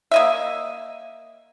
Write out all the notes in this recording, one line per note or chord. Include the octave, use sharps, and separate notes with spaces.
A#3 D#5 E5